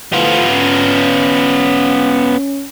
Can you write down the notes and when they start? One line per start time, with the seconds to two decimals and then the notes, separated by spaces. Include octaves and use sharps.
0.13 E3 F3 A3 B3 F4
0.49 C#4